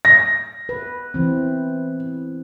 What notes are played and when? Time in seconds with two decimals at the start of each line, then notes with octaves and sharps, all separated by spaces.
0.05 A#6
0.69 B4
1.14 E3 C4